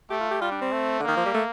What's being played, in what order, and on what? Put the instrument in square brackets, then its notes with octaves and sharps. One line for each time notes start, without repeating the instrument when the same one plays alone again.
[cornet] A3 [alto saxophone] G4
[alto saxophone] F4
G4
[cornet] G3 [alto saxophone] F4
[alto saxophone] D4
C4
[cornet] A3
[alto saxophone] D3 [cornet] A#3
[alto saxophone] D#3
F3
G3
A3